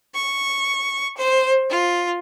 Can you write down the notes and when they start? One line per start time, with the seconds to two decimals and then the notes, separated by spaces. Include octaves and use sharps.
0.15 C#6
1.17 C5
1.70 F4